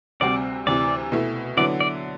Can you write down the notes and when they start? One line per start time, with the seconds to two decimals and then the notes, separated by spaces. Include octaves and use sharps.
0.20 D2 C3 G3 C4 F#4 D5
0.67 D2 C3 E3 D5
1.12 B2 A3 E4
1.57 D3 F#3 B3 E4 D5
1.80 D5